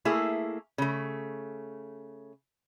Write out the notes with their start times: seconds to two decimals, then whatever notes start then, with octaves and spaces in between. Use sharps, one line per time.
0.05 A3 A#3 E4 G#4
0.78 C#3 A3